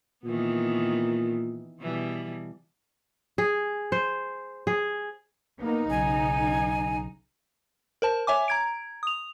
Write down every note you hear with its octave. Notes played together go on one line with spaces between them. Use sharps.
A#2 D#3 E3 B3
B2 E3 G3
G#4
C5
G#4
A#3 B3 D#4
B1 C#3 G#5
A#4 C5 A5
C#5 E5 G#5 D6
A#5 G#6 D7
D#6 F7